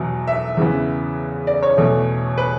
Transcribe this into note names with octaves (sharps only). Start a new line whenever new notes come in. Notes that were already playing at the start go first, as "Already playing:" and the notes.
Already playing: E2 B2 F#3 B3
E5
E2 C#3 E3 B3
D5
C#5
E2 B2 A3
B4